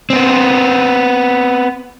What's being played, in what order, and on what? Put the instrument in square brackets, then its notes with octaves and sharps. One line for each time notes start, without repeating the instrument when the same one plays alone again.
[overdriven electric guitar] B3 C4